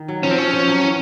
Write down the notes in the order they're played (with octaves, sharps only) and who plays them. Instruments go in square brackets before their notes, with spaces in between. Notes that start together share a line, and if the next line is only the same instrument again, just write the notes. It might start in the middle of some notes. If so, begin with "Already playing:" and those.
Already playing: [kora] D#3
F#3
[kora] F3 [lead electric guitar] C#4
[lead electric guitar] C4
[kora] F3 [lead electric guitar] C#4
[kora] F3
F#3
E3